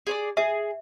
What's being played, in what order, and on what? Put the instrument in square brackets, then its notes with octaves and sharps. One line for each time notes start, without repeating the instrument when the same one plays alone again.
[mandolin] G#4 C#5 D5
[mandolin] G#4 [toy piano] E5